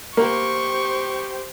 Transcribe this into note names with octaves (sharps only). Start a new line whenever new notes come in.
A#3 G4 C5 C#6